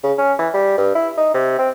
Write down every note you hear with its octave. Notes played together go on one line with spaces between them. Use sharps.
C#3
C#4
E3
G3
G2
E4
D#4
C3
C4